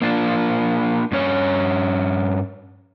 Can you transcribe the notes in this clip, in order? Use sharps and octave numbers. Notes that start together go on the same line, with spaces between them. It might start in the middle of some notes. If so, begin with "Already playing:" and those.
A#3 D4 F4
G2 C#4 C#5